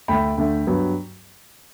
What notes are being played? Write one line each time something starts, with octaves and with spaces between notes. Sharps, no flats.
D2 D3 A3 G5 B5
D2 D3 A3
G2 F#3 B3